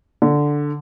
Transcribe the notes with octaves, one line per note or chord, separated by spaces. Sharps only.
D3